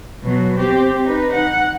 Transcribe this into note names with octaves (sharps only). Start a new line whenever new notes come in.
B2 F#3
C4 G4
D#4 B4
F#5